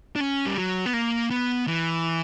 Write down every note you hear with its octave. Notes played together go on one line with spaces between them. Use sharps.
D4
C#4
G3
F#3
B3
A#3
B3
E3